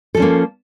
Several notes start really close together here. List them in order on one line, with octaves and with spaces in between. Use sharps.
A4 F3 C#4 A#3